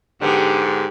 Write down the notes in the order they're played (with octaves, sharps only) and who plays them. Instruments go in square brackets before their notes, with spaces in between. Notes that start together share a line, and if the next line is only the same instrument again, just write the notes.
[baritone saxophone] G#2 [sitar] D3 B3 [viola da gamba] G4